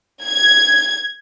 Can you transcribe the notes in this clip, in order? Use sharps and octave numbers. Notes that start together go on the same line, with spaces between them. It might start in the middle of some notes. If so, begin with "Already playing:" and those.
G#6